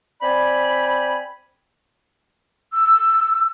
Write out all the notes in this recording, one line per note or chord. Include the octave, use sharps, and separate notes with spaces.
C4 D5 G5 G#5 B5
E6